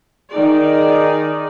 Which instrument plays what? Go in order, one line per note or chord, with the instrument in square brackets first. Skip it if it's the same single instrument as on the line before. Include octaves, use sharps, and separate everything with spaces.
[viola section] D#3 D#4 G#4 D5